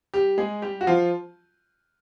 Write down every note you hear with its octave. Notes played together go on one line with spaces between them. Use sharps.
G3 G4
G#3 G#4
G3 G4
F#4
F3 F4